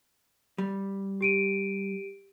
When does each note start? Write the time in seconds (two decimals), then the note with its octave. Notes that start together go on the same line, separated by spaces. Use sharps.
0.58 G3
1.21 G4 D7 D#7